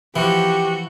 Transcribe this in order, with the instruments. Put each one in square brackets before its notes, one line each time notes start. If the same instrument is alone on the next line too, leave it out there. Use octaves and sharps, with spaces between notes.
[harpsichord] E3 [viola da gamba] F3 [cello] F#4 [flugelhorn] G4